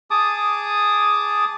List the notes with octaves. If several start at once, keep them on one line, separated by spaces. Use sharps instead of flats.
G#4 A5 D6 D#6